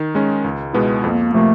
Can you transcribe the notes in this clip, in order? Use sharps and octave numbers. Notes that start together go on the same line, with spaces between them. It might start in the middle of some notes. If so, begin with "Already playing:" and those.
Already playing: D#3
G#3 C#4
C#2
B2 G#3 B3 E4
F2 A#3
C3 F3 A3 A#3